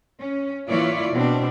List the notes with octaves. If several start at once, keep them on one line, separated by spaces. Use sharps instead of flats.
C#4
E3 A#3 E4 F4 C#5 D5
B2 C4 D4